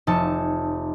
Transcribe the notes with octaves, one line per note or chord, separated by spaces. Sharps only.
F1 D#4 A5 E6 C#7